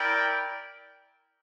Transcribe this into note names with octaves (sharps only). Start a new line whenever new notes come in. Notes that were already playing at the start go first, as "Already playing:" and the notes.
Already playing: E4 A#4 D5 G5